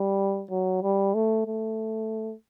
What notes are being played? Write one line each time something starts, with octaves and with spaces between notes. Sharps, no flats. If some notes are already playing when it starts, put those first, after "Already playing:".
Already playing: G3
F#3
G3
A3
A3